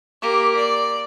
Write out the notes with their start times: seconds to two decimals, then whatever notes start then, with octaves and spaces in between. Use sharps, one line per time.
0.22 A#3 G4
0.56 D5